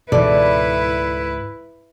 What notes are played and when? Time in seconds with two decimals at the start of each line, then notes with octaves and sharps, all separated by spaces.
0.12 C#2 G#2 B2 E3 E4 A4 B4 D5